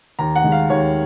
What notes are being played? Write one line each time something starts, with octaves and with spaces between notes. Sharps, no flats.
D#2 A#5
F#5
D#3 G#3
F5
D#2 C#5